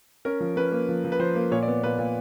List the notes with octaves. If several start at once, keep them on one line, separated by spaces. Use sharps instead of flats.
C#4 A#4
F3
C#4 B4
A#3
F3
F3
B4
F3 C5
A#3
A#2 C#5
D5
B3
A#2 B4
A#2